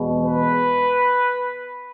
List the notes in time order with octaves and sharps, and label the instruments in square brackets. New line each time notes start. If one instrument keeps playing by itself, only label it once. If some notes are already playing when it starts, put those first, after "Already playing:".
Already playing: [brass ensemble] E2 B2 G#3
B4